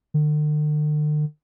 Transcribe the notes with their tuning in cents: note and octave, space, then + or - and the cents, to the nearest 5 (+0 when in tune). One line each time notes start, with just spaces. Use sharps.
D3 +45